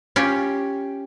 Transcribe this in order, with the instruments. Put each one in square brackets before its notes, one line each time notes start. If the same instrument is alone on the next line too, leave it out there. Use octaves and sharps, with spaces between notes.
[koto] C#4 F4 G4